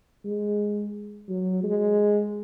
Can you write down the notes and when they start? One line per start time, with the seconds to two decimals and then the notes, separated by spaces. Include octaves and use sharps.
0.25 G#3
1.29 F#3
1.64 G#3